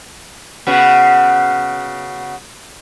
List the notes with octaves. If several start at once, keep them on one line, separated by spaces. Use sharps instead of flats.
C#3 B3 F#4